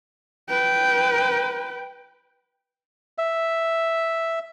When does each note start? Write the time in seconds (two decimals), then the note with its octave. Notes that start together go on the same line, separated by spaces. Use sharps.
0.49 B4 G5
3.18 E5